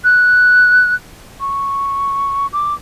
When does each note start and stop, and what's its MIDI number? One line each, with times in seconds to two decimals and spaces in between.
0.04 0.94 90
1.40 2.47 85
2.53 2.74 86